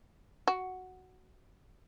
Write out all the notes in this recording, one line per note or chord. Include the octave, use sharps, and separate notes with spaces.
F#4